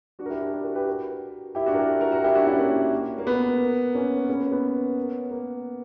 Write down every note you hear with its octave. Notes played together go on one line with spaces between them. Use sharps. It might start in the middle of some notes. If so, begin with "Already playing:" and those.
D4 F#4
A#4
E4 G4
D4 F#4
E4 G4
F#4 A#4
G4 B4
F#4 A#4
E4 G4
D4 F#4
A#4
E4 G4
F#4 A#4
F#4 A#4
E4 G4
D4 F#4
C#4 E4
A#3
A#3
B3
A#3 C#4
A#3 C#4
B3
B3
A#3